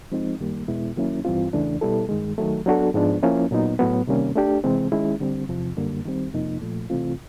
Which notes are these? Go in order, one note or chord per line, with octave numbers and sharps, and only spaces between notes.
F3 G#3 C4 D#4
F#2 D#3 G3 A#3
E2 B2 G#3 B3 E4
D#3 F#3 A#3 C#4 E4
G2 E3 G3 C4 F4
E2 C#3 E3 A3 D4
B2 G3 B3 E4 A4
G2 D#3 G#3
D#3 F#3 A3
F#3 B3 D4 F#4 A4
G#2 F3 G#3 B3 D4
F3 A#3 C#4 E4
A#2 F#3 B3 D#4
A2 F#3 B3
C3 D#3 G3 A#3 C#4
A3 D4 G4
C3 E3 G#3 C4
D#3 G#3 C#4 E4
D3 G3 C4
E2 C3 F3
F#2 D3 G3 A#3
D#3 G3 C4
F2 C3 F3 A#3 D#4
A#2 F3 A3
C3 E3 A3 C4 F4